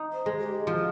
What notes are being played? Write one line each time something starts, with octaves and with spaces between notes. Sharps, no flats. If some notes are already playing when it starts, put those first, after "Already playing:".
Already playing: D#4
C5
G#3
G4
F3 F#4 G4